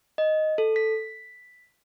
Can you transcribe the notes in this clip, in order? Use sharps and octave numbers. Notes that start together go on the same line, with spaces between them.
D#5
A4
B6